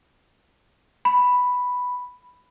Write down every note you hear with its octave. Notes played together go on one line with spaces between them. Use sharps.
B5